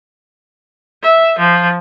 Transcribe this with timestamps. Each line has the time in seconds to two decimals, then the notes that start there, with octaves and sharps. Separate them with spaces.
1.02 E5
1.39 F3